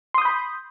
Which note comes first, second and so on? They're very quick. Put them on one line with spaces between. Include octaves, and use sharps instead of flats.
C6 D#6 G6 B5